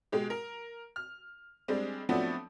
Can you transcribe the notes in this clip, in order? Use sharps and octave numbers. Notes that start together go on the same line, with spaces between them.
B2 G#3 G4
A#4
F6
G3 G#3 C4 D4
F3 F#3 A3 B3 C4 D4